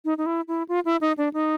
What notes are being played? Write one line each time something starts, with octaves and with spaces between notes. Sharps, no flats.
D#4
D#4
E4
E4
F4
E4
D#4
D4
D#4